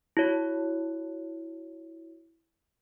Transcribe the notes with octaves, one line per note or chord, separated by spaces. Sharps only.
E4 F#4 C#5